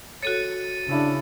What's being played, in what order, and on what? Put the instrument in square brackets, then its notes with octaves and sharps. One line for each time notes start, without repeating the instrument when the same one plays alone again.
[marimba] F#4 A4 C#5 [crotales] A6 C#7 D#7
[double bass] C#3 E4 [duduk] D4